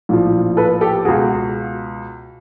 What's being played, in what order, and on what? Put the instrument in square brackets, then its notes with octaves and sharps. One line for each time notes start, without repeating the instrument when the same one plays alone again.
[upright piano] A#1 A2 F3
A4 B4
G4 A4
B2 F#4 G#4
C#2
F#4